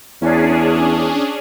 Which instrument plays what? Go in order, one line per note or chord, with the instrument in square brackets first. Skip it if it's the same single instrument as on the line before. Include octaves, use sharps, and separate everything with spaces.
[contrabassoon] E2 [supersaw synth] C#4 D4 G#4